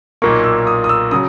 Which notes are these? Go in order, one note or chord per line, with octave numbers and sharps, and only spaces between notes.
B1 A#2 A#3 C#6
E6
D#6
D#6
E6
C#3 F#3 D#6